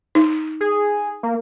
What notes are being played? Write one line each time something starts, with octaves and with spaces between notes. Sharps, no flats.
D#4
G#4
A#3